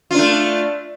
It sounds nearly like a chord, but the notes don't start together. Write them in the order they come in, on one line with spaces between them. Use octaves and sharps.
F4 D4 A3